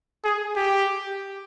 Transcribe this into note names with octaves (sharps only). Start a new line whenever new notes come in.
G#4
G4